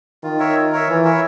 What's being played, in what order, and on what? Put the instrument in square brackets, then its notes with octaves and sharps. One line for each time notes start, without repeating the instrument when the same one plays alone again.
[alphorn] D#3 [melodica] F4
[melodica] A#4 C#5 E5
F4
A#4 C#5 E5
[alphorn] E3 [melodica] F4
[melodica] A#4 C#5 E5